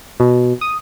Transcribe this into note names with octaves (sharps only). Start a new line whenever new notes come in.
B2
D#6